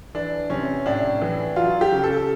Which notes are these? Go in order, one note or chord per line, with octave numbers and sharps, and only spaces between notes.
E3 D4
C3 C#4
A2 D4
E3
F#3 F4
G4
C#3
A4